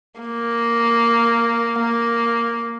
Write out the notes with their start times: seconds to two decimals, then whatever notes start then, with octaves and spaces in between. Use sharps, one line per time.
0.20 A#3
1.79 A#3